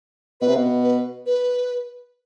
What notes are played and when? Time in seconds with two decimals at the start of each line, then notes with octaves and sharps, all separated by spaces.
0.41 B2 B4
0.48 C3
0.57 B2
0.83 B4
1.26 B4